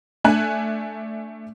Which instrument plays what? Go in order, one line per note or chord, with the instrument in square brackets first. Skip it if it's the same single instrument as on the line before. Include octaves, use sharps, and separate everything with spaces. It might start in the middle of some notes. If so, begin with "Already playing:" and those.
[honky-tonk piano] A3 D4 G#5 F#6